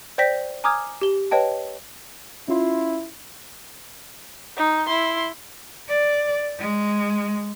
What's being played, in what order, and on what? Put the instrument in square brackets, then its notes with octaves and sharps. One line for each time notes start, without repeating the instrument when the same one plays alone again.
[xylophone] C5 D5 G5 G6 A#6 B6
G#5 A#5 D6 D#6 F6 G#6
G4 G7
B4 C#5 D#5 G5 A5
[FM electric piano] C#4 F4 C6 [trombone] E4
[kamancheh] D#4
E4 C6
[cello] D5
G#3